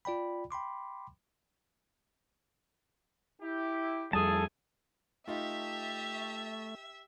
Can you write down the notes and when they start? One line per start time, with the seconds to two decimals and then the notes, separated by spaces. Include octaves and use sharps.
0.05 F4 D5 G5 B5
0.51 G5 B5 C6 D6
3.41 E4 G4
4.13 F2 A2 G3 G#4 A4 A5
5.28 A3 D#4 F4 G4 E5